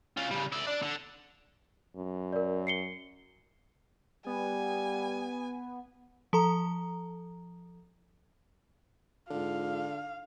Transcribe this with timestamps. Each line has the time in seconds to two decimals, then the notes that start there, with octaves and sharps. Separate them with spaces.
0.17 C#4 F4
0.31 C#3 G3
0.52 D5 E5
0.67 D4
0.82 D3
1.96 F#2
2.33 A#4 D5
2.67 C7 C#7 G7
4.26 G3 B3 G#5
6.33 F3 A4 A#5
9.30 G#2 D3 F4 F5